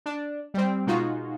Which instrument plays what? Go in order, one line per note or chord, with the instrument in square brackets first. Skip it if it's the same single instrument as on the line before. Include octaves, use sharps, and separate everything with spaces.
[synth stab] D4
G3 C4
B2 G#3 D#4 F4 F#4